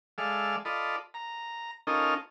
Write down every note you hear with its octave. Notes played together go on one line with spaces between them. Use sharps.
G#3 A4 D5 E5 F5
F4 A4 D5 D#5 B5
A#5
C#4 D#4 F4 A4 A#4 D#5